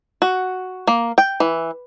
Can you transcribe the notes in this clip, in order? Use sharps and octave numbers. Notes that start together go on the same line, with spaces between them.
F#4
A#3
G5
E3